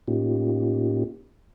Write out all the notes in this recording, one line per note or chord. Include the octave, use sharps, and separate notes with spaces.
A2 A#3 C#4 D#4 F4 G4